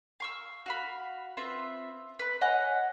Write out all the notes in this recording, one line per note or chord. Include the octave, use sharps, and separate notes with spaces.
F5 C#6 E6
F#4 F5 B5
C4 F4 B4 E5
B4 B5
C#5 D#5 F#5 G#5